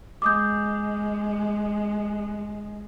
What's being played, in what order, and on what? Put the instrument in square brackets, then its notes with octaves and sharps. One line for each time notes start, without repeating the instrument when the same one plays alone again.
[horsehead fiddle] G#3 [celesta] D6 D#6 G6